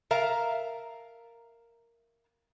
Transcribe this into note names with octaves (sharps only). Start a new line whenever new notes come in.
A#4 E5 F5 A5 A#5